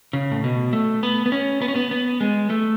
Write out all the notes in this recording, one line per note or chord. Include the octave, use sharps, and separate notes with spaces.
C#3
A2
B2
A3
B3
B3
C#4
B3
C#4
B3
B3
G#3
A3